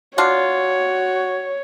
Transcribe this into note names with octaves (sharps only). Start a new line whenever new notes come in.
D4 F4 F#4 C#5